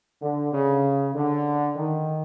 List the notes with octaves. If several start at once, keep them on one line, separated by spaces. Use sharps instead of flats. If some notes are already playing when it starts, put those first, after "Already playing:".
D3
C#3
D3
D#3